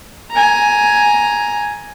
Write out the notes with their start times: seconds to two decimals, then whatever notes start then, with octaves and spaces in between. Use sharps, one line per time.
0.31 G#5 A#5